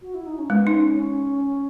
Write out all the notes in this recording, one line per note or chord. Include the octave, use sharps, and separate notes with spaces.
F#4
E4
D#4
C#4
G#3 B3
D#4
C#4
C#4